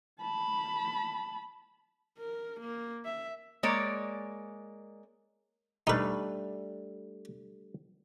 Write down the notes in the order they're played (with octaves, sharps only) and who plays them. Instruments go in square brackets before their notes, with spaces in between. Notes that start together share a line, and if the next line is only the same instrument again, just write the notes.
[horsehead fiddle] A5 B5
A#4
A#3
E5
[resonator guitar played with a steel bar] G#3 A#3 C#5 D5
[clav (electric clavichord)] G3 A3 D4 [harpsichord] D#4 B4